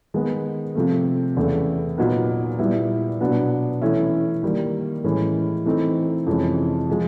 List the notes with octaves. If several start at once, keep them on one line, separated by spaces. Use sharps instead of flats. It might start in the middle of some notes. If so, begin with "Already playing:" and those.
D#3 G#3 B3
C3 F3 A3
E2 C#3 E3 A3
A#2 F#3 B3 D#4
A#2 G3 B3 E4
B2 F#3 B3 D4
E3 A3 C#4 E4
D#3 G3 A#3
A2 E3 G#3 C#4
E3 A3 C4 D#4
F2 C3 E3 G#3 C#4
F3 G#3